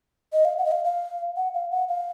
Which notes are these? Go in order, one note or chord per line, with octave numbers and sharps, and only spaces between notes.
D#5
F5
F#5
D#5
F5
F5
F#5
F5
F#5
F5